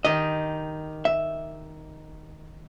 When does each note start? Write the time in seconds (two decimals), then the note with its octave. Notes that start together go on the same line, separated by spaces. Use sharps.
0.05 D#3 D#4 G4 D#5
1.05 E5